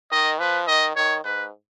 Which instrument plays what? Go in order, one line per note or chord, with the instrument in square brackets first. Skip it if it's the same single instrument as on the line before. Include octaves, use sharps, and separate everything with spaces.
[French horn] D#3 [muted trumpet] D#5
[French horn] F3 [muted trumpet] B4
[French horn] D#3 [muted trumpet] D#5
[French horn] D#3 [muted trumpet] C#5
[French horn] G#2 [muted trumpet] B4